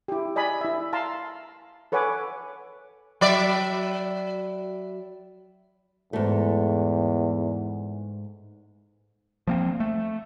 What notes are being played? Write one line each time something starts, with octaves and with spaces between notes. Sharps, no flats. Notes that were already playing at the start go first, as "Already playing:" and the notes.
E4 G4
D5 D#5 G#5 B5
E4 E5
F5 A5 A#5 C6
A4 B4 C#5 F#5 G#5 D6
F#3 D5 E5
E2 G#2 A3
F3 A#3 C4
A3